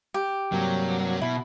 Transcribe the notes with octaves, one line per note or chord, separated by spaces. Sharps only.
G4
G2 C3 F#3 A#3
B2 E4